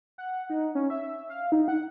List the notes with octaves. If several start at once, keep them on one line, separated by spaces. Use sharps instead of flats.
F#5
D#4
C#4
E5
F5
D#4
F#5